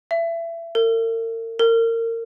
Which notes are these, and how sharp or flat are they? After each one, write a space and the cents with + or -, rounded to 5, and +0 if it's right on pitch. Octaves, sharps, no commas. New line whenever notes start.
E5 +25
A#4 -40
A#4 -30